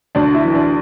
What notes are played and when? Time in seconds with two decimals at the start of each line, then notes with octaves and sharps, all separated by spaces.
0.15 D2 D4
0.34 E4
0.45 E3
0.55 D4